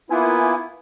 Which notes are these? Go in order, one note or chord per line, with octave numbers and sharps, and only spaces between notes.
A#3 B3 E4 F4 G#5